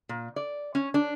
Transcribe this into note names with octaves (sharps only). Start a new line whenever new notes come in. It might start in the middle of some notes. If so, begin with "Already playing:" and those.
A#2
D5
C#4
D4